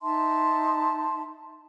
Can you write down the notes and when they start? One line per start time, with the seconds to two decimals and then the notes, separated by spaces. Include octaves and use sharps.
0.02 D#4 E5 A5 C6